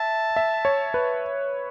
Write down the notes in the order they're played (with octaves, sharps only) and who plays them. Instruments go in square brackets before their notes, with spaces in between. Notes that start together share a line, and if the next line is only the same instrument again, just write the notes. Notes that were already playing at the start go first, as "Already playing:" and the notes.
Already playing: [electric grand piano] E5 [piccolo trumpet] A5
[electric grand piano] E5
C#5
B4